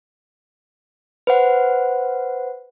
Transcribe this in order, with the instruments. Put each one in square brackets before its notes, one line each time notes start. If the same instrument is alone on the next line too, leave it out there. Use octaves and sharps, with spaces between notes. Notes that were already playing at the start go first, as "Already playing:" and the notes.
[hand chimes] B4 C5 F#5